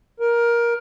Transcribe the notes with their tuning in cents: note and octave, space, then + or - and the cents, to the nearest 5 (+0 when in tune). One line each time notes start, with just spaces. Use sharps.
A#4 +15